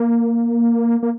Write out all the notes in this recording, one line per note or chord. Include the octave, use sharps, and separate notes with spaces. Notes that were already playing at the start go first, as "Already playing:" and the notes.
Already playing: A#3
A#3